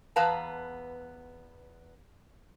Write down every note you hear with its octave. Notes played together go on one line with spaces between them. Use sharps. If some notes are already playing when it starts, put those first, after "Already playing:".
E2 B3 B4 F5 A5 A#5